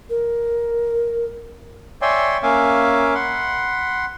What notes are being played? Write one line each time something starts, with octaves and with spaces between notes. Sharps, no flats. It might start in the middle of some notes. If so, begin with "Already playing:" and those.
A#4
C#5 D5 E5 G5 G#5 C6
A#3 C#4 E5 F5 G#5 D6
F#5 B5 C6